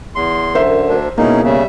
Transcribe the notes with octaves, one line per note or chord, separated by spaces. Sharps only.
E2 C6
F#2 D3 A#4 C5 E5
D2 D4
B2 A#3 C#4 D#4 E4 G#4
C#3 G3 E5